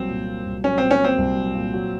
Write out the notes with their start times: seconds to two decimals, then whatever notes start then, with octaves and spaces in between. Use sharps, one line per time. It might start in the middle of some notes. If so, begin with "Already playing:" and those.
Already playing: C2 F#3 A#3 C4
0.09 A#2
0.27 A#3
0.45 C2
0.64 F#3 C#4
0.78 A#2 C4
0.91 C#4
1.01 A#3 C4
1.18 C2
1.37 F#3
1.55 A#2
1.73 F#3